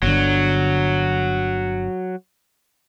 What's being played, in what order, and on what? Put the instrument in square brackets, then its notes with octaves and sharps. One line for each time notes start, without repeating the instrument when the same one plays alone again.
[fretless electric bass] G1 D3 [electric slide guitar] F#3